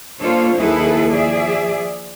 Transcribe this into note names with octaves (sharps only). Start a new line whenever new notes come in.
A#3 D4 F4 A4 C5 C#5
D#2 F#3 E4 G#4 A4 B4
F3 G#4 D5 E5